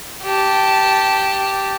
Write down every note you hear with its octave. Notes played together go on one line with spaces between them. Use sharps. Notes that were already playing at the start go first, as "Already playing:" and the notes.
G4 A5